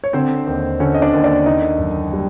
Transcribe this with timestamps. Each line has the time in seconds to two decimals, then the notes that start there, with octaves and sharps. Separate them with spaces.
0.04 C#5
0.13 D3 C4 C5
0.47 D#2
0.80 D3 C#4 C#5
0.94 D#5
1.02 D4 D5
1.14 D#2
1.24 D4 D5
1.46 D3 D#4 D#5
1.79 F#1
2.13 G3